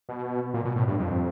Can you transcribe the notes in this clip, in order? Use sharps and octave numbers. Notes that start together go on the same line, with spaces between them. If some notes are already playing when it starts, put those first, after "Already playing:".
B2
A#2
B2
A2
G2
F2